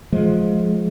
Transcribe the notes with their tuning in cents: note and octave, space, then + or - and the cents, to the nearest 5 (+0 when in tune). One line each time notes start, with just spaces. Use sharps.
F3 +15 G#3 +20